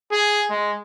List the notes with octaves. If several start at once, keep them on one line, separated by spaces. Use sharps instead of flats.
G#4
G#3